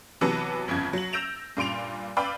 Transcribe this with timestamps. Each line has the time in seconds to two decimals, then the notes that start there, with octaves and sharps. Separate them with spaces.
0.21 C3 E3 F#3 B3 A5
0.68 G1 F2 C#3 G#6
0.93 F#3 F#7
1.13 E6 G6 A#6 D7 E7 F7
1.57 G2 A#2 C6 D7 F7
2.17 B4 D5 F5 G5 B5 E6